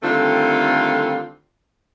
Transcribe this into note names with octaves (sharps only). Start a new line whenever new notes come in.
D3 D#3 G3 A3 C4 F4